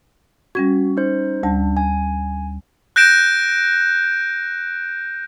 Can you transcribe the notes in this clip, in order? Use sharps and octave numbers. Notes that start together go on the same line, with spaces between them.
G3 C#4 F#4 G#6
D#4 C5
D2 G3 D4 A5
G#5
F#6 G6 A#6 D7 E7